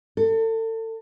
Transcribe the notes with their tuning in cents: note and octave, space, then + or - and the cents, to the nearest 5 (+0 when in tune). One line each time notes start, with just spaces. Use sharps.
A4 +35